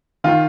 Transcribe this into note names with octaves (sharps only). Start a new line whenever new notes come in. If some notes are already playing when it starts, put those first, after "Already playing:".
D#3 F4